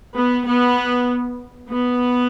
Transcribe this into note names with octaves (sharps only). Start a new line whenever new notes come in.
B3
B3
B3